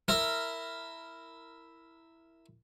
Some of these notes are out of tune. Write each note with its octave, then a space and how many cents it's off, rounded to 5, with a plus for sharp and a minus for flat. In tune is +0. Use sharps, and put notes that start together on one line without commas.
E4 +0 A#4 -15